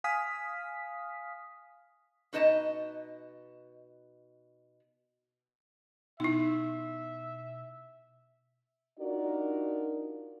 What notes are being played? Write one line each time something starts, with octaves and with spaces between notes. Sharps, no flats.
F5 G#5 D#6 F6 B6
B2 D#4 B4 D#5 A5
B2 D#4 E4 E5
D4 D#4 F4 F#4 A#4 D5